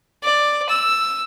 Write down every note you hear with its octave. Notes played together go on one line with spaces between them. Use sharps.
D5
E6